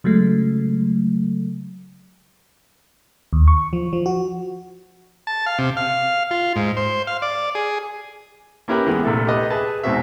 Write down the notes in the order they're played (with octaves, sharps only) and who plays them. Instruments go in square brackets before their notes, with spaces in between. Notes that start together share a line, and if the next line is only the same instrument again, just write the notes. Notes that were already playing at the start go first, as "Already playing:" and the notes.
[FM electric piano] C#3 F#3 G#3 A3
D#2
C#6
F3
F3
F#4
[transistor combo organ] A5
F5
C3
F5
F4
G#2
C5
F5
D5
G#4
[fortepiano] A#3 C#4 E4 G4 A#4 B4
E3 G#3 B3
A#1 C3 A3 A4 E5
G4 A4 B4 D#5
G#4 B4 E5 A5
E2 G#2 B2 C4 F#4 E5